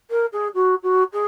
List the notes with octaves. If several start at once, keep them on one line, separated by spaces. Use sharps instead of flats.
A#4
G#4
F#4
F#4
G#4